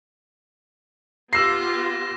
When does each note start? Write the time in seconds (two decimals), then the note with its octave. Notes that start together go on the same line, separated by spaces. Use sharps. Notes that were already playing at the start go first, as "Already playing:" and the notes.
1.33 B3 F4 G4 E6 A#6 C7 E7